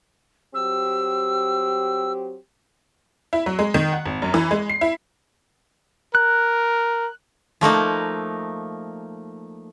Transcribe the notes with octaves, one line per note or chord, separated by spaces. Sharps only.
F#3 C4 G4 E6
E4
F#3
G#3
D#3
F#5
G#1
F#2
E3
G#3
C7
E4
A#4 F#6
F3 A3 A#3 D#4